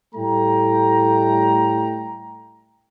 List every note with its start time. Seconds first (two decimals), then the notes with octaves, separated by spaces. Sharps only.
0.15 A2 G3 A3 G5 A#5